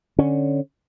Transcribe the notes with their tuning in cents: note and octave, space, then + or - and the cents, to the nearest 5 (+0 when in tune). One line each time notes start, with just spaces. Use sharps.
D3 +5 C#4 +0